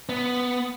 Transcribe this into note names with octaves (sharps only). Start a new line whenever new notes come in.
B3